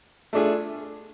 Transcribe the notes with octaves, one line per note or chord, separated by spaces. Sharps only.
A3 D4 F4 G#4